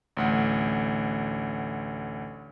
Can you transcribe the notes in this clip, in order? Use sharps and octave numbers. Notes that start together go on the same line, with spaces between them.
A1 D2 F#5